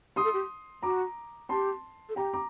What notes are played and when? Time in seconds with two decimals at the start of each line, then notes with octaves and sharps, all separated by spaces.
0.16 G4 C6 D#6
0.24 A4
0.34 G4
0.82 F#4 A#5 D6
1.49 G4 A5 C6
2.09 A4
2.16 G4 G5 A#5
2.33 A#5 D6